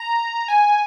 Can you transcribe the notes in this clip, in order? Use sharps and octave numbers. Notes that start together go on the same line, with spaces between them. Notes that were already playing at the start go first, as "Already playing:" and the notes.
Already playing: A#5
G#5